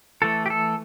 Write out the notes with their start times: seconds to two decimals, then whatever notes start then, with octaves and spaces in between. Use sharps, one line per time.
0.22 E3 A3 A4
0.46 G4
0.50 A4